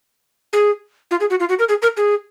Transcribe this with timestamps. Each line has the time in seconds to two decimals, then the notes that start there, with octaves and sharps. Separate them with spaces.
0.53 G#4
1.11 F4
1.20 G#4
1.30 F#4
1.40 F4
1.49 F#4
1.59 A#4
1.69 G#4
1.82 A#4
1.97 G#4